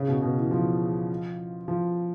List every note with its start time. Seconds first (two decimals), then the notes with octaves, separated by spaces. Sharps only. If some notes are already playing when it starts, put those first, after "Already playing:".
Already playing: C#3
0.08 B2
0.22 B2
0.37 E3
0.51 F3
1.68 F3